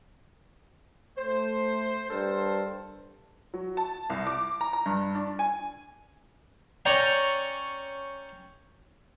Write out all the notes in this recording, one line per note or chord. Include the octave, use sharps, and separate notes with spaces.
A3 C5
G2 A4 A#4 C5
F#3
A5
C2
D6
A#5
A#5
G2
D4
G#5
C#4 D5 G5 A#5